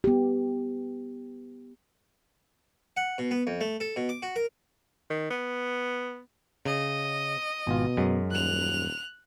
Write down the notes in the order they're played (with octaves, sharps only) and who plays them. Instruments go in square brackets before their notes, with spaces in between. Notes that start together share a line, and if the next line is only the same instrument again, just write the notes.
[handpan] B3 G4
[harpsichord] F#5
B2
B3
F2
A3
A4
B2
D6
F#4
A#4
[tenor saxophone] D#3
B3
[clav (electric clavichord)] C#3 [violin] D#5
[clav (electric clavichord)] G#1 F4 [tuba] B2
[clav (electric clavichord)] F#2 F#3 G#3
[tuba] D#1 [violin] F#6 F7